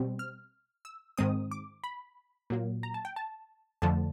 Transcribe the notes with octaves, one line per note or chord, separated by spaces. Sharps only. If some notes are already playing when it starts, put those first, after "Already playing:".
Already playing: B2 G3 C4
F6
E6
G#2 D#3 G#3 C4 D#6
D6
B5
A#2 F#3 A#3
A#5
A5
G5
A5
F2 D3 F3 A3 A5